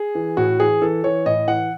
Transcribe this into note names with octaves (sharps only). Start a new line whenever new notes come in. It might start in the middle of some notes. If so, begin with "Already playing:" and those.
Already playing: G#4
E3
A2 F#4
E3 G#4
E3 A4
E3 C#5
A2 D#5
E3 F#5